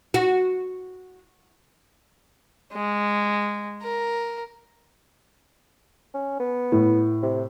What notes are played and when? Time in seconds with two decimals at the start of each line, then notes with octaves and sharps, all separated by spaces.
0.14 F#4
2.74 G#3
3.83 A#4
6.14 C#4
6.40 B3
6.72 A2
7.23 C3